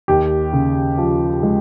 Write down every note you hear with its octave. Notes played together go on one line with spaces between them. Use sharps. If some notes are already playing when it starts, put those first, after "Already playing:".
D#2 G4
C#3
F3
G#3